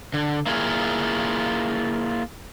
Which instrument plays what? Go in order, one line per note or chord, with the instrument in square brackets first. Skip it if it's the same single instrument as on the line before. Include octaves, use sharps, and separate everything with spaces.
[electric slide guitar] D3
A#3 E4 F4 G#4